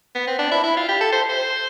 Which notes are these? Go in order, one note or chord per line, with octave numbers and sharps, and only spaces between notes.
B3
C4
D4
E4
E4
F4
G4
A4
C5
C5